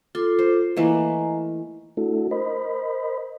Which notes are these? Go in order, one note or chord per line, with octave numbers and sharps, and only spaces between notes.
F4 A4 C6 D6
C5
E3 A3 A#3 D#5 G#5 A#5
A3 D4 E4 F#4 A4
A#4 C5 D#5 B5